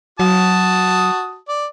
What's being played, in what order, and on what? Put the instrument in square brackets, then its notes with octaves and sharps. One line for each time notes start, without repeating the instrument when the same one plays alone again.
[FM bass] F#3 [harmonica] F#4 A5 D#6
[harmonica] D5